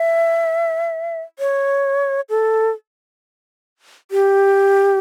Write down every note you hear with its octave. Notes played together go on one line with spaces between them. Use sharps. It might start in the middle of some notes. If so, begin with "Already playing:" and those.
Already playing: E5
C#5
A4
G4